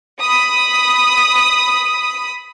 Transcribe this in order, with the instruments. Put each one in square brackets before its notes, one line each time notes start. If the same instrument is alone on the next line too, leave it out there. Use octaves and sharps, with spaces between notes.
[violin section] B5 D#6